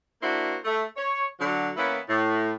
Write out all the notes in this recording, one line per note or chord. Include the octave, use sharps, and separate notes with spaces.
A#3 D4 E4 F#4 C5
A3
C#5
D3 F#3
E3 A#3 B3 C#4 E4
A2